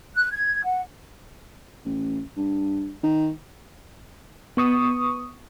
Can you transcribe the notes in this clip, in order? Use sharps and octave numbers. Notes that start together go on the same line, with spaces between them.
F#6
G#6
F#5
A1
G2
D#3
B3 C#6 D#6